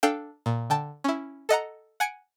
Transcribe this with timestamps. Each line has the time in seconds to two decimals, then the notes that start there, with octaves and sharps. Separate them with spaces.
0.03 D4 A4 F5 G5
0.46 A#2
0.70 D3 G5 A5
1.04 C#4 E4
1.49 A4 D#5 F#5 A#5
2.00 F#5 G#5 G#6 C#7 D7